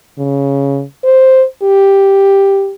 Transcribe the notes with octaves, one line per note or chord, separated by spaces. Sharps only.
C#3
C5
G4